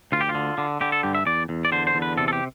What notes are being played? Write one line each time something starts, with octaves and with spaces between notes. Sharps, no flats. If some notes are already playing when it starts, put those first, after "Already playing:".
D2 F4
G4
F4
D3
D3
D3 G4
A4
G2 G4
E5
E2 D5
E2
D5
D3 C5
C5
E2
B4
C3 A4
A4
G4